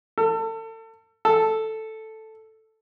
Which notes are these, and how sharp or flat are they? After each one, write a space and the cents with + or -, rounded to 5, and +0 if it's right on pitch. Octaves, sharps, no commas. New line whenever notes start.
A4 +35
A4 +0